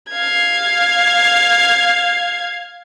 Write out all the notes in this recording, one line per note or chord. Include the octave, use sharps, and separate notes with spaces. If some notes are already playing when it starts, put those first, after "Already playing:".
F5 G#6